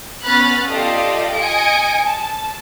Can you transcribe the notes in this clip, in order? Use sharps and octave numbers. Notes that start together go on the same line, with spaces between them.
B3 C#4 B5 F6 F#6 A6
F4 G4 A4 D5 D#5 F5
D#5 G#5 C#7 D7
A5